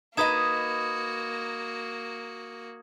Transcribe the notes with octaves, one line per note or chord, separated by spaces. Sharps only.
A#3 D#4 F#4 B4 D#5 D#6 G#6 E7